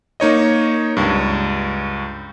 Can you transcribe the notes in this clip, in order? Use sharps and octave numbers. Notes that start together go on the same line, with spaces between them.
A#3 D#4 C#5 D#5
C#2 G2